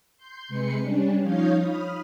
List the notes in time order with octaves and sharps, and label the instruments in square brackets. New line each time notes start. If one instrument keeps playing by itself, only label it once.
[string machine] C6 G6
C3 G#3 B4 C7 C#7
G3 C#4 D4
F3 D#4 C#5 F5 D#6 G6
B5 D#6 F6